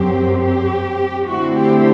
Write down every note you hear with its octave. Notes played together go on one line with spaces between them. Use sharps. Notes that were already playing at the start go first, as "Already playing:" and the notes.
Already playing: F#2 F#3 C4 G4
G4
D3 A3 C4 E4 F#4
G4